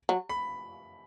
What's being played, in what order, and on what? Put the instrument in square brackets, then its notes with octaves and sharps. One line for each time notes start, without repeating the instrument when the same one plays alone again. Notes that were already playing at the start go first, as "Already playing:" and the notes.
[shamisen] F#3
[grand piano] B5